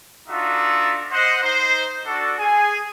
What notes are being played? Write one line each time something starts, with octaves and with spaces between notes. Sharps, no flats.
D4 D#4 F4 F#4 A4 E5
C5 D#5 F#5
D#4 C5
D4 F#4 A4
G#4 G#5